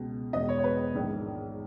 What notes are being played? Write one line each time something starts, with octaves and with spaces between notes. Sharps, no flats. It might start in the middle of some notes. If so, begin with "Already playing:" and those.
Already playing: C#2 B2
E1 E2 B2 D#5
C#5
C#5
B4
A#1 G#2 D#3